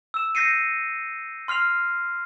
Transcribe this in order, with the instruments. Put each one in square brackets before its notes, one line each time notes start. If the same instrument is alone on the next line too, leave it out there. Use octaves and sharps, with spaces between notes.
[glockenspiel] E6 E7
G6 A#6 C7 C#7 D#7
C6 F6 C7 F7